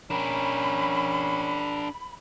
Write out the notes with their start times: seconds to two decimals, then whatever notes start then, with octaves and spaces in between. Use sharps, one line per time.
0.10 C#4 D4 A#4 B5